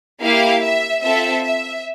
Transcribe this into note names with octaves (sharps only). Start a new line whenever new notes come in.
A#3 E4 G4 F5
E5
C4 F4 A4 E5
E5